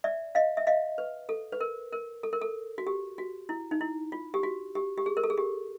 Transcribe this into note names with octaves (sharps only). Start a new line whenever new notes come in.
D5 E5
D#5 F5
E5
D#5 F5
B4
A4
B4
A#4
A#4
A4
A#4
A4
F#4
G4
F#4
E4
D#4
E4
F4
G4
F#4
G4
G4
G#4
A#4
A4
G#4
G4